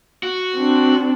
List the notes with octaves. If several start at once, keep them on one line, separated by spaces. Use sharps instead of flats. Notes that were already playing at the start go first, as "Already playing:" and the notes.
F#4
C4 D4